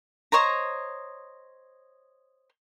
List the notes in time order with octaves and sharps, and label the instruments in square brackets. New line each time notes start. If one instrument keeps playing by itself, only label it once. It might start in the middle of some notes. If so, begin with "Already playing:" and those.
[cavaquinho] C5 C#5 D#5 A#5